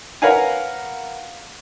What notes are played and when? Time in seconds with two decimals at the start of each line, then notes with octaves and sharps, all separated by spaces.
0.22 A#4 B4 C#5 F5 F#5 G#5